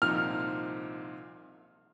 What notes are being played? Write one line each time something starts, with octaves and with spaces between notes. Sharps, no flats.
C2 A#2 F3 C4 D#4 F6